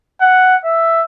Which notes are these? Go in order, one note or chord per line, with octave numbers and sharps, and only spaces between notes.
F#5
E5